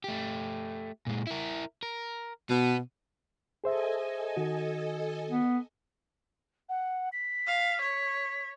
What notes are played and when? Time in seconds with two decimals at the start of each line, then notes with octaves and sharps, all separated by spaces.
0.04 A3 G4
1.07 A#2 G#3
1.27 E4 A#4
1.83 A#4
2.50 B2 B3
3.64 G#4 A4 C5 D#5 E5 G#5
4.37 D#3 F#4
5.30 B3
6.69 F#5
7.12 B6
7.47 F5
7.81 C#5